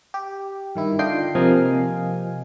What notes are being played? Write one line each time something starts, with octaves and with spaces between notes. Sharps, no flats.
G4
G2 D#3 E4
D3 D4 F4 D#5 G5 C7
C3 F3 A#3 D#5 F5 G#5